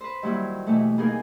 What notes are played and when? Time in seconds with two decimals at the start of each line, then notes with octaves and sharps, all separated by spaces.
0.01 B4 C5
0.22 D#3 F#3 G3 A#3 E4
0.67 B2 E3 A3
0.98 A#3 B3 D#4 G#4 A#4